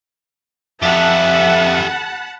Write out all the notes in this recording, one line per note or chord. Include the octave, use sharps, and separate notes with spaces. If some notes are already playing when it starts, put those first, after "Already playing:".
F2 G4 A4 E5 F#5 A5 B5